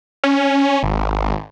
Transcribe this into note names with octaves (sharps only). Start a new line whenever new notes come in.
C#4
G#1